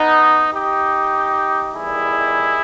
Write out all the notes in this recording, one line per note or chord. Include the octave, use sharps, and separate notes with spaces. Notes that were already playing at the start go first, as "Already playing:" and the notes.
Already playing: B3 D#4
D#4 G4
E2 D#3 G3 E4 G#4